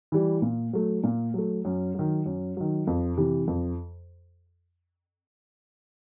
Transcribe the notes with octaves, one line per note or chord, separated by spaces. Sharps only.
E3 G3
A#2
F#3 A3
A#2
F#3 A3
F#2
D#3 F#3
F#2
D#3 F#3
F2
C3 E3
F2